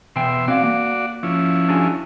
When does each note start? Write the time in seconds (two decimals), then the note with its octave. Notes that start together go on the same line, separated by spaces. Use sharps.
0.16 E2 B2 E5 G5 C6
0.48 C4 F#4 D5 F5
0.64 A#3
1.23 F3 C#4 E4
1.68 D4 F#4 G#4